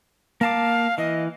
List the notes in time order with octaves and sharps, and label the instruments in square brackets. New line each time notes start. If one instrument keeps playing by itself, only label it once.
[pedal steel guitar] A#3 A5 D6 [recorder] F5
[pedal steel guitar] E3 [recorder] D#5